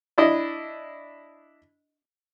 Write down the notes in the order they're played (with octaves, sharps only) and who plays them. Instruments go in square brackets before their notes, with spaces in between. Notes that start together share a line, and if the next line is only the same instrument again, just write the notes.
[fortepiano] D4 E4 D#5